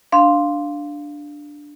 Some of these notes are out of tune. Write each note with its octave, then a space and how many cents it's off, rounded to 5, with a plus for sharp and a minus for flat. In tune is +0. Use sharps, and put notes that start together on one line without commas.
D4 +0 F5 +0 C6 +0